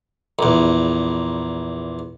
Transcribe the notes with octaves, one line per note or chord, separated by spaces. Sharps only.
A#1 E2